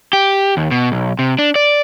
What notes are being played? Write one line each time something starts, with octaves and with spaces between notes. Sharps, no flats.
G4
D#2
B2
B1
C3
D4
D5